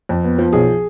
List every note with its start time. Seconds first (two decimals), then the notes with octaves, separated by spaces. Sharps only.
0.09 F2
0.24 B3
0.39 F3
0.53 B1 G#4